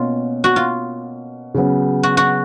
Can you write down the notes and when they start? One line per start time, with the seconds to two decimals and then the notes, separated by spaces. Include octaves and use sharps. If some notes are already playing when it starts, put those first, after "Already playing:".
Already playing: B2 A#3 C#4 F4
0.44 F#4
0.56 F4
1.54 C#3 F#3 B3
2.03 F#4
2.17 F#4